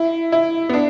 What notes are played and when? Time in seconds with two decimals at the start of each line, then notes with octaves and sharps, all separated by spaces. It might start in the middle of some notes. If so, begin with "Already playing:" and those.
Already playing: E4
0.32 E4
0.69 B3
0.73 D4